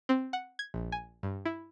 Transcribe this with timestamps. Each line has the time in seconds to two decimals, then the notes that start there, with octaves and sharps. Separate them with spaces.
0.09 C4
0.33 F#5
0.59 G#6
0.74 A#1
0.92 G#5
1.23 G2
1.45 E4